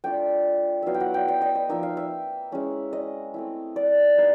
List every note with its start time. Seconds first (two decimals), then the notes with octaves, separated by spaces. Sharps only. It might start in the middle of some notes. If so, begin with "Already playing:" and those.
0.04 A3 D4 F4 G5
0.82 F#3 B3 E4 E5 F5
0.94 G5
1.00 F#5
1.14 G5
1.28 G5
1.41 D#5
1.55 D#5
1.69 F3 A#3 D#4 E5
1.83 F5
1.97 E5
2.52 G#3 C#4 E4
2.93 D#5
3.34 A3 C4 E4
3.76 D5
4.17 G3 B3 D#4